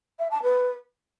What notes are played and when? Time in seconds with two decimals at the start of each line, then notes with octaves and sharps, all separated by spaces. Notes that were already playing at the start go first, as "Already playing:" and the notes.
0.19 E5
0.31 A5
0.43 B4